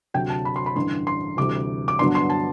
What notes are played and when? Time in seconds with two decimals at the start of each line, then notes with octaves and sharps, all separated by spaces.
0.14 D2 C3 F#3 G5
0.30 A5
0.45 B5
0.56 C6
0.66 B5
0.76 A1 G2 D3 C6
1.07 C6
1.37 D2 C3 E3 G3 D6
1.88 D6
1.99 G2 D3 F#3 B3 D4 C6
2.15 C6
2.30 A5